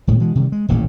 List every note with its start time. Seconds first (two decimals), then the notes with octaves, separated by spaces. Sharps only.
0.07 D#1 A2 G#3
0.20 B2 E3 G#3
0.35 C3 D#3 G3
0.52 G#3
0.69 D#1 A1 A2 A#3